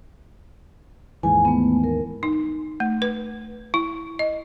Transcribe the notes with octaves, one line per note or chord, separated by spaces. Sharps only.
D#2 G#2 E3 G#5
A3 B3
A#4
D#4
A3
B4
E4
D#5